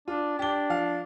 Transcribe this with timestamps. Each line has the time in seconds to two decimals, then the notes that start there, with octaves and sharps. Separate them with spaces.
0.08 D4 F4
0.39 D4 G4 G7
0.70 F3 F5